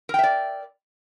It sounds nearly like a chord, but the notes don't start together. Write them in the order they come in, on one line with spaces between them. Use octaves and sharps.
A#4 G5 E5 D5